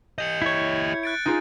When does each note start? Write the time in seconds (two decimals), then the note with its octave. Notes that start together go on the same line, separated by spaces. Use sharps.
0.18 G4 D#5 G6 C#7
0.42 E4 C#5
1.03 F#6 A6 D7
1.25 D#4 F4 G#4